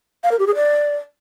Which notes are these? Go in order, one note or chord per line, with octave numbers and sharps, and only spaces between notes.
F5
A#4
G4
G#4
D5